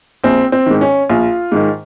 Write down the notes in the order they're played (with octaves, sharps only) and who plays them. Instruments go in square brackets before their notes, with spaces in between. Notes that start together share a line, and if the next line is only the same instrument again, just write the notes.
[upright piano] A#1 C4
C4
G#2 D#3
C#4
A#1 F4
G#2 D#3